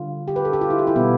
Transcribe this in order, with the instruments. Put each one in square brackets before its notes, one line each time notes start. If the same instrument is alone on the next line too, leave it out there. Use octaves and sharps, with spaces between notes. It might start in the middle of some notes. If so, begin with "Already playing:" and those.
Already playing: [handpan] D3 G3 F4
G4
B4
A4
G4
F4
E4
G4
E4
B2 G3 B3